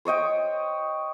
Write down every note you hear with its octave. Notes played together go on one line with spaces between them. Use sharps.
C5 C#5 D#5 G5